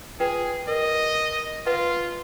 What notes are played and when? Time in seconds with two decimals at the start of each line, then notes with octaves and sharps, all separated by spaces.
0.20 F4 G#4 B4 G5
0.68 A#4 D#5
1.66 F4 B4 D#5 F#5